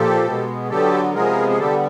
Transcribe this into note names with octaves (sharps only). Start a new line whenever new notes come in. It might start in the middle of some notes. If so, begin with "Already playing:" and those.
Already playing: A#2 F3 G4 A4
B2 G#3 B3
D3 F#3 B3 G4 A4
C3 F3 G#3 B3 G#4 A#4
G#4
D3 G3 B3 G4 A4